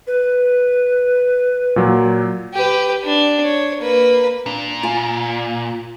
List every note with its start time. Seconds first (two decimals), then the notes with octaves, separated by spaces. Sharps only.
0.07 B4
1.76 A#2 F#3
2.54 G4 B4
3.04 D4
3.45 C#5
3.80 A#3 B4
4.46 A#2 D4
4.83 F4 F5 G#5